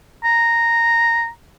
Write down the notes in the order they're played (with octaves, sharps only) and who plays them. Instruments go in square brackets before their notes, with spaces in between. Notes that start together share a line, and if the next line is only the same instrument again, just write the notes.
[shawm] A#5